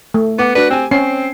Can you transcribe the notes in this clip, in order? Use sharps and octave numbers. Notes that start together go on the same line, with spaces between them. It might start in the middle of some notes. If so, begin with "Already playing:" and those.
A3
B3 F#5 D6
D4 F#4 B4
C4 G4 G#5
C4 C#4 C7